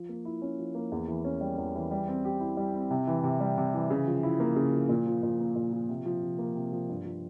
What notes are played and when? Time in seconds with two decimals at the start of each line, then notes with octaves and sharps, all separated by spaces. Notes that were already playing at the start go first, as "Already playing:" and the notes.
Already playing: F3
0.09 A#3
0.25 E4
0.42 C#4
0.59 F3
0.75 A#3
0.92 E2
1.08 E3
1.25 C#4
1.41 G3
1.58 E2
1.75 E3
1.91 G3
2.08 C4
2.25 G4
2.40 E4
2.57 G3
2.74 C4
2.91 C3
3.07 E3
3.23 C3
3.40 G3
3.58 C3
3.74 E3
3.90 C#3
4.07 F3
4.23 E4
4.40 A#3
4.56 C#3
4.73 F3
4.89 A#2
5.06 F3
5.23 A#2
5.40 A#3
5.56 A#2
5.72 F3
5.89 C3
6.06 F3
6.22 C3
6.39 A#3
6.55 C3
6.72 F3
6.89 G2
7.05 F3